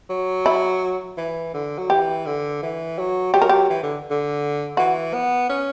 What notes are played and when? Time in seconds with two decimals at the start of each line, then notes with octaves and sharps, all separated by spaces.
0.10 F#3
0.46 E4
1.17 E3
1.54 D3
1.78 F#3
1.90 E3 G4
2.26 D3
2.62 E3
2.98 F#3
3.34 F#3 G4
3.42 A#4
3.49 G4
3.70 E3
3.83 D3
4.10 D3
4.77 E3 F#4
5.14 B3
5.50 C#4